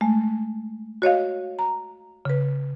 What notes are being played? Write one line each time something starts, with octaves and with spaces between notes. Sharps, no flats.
G#3 A3
F#4 C#5 D#5 F5
A#5
C#3 B4